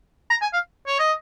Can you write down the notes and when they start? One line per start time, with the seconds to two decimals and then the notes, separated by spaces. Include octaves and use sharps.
0.30 A#5
0.42 G#5
0.53 F5
0.87 C#5
0.99 D#5